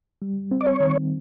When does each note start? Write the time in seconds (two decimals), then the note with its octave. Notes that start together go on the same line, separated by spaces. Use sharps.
0.22 G3
0.51 C4
0.61 D5
0.67 C#5
0.80 D#3